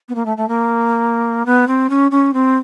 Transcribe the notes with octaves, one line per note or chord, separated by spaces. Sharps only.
B3
A#3
A3
A3
A#3
B3
C4
C#4
C#4
C4